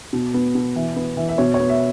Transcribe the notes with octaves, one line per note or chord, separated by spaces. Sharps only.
B2
B3
B2
E3
B3
E3
E5
B2 C#5
C#5
B3
E5